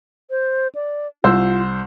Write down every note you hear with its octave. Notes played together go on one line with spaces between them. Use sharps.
C5
D5
C2 F4 C5 E6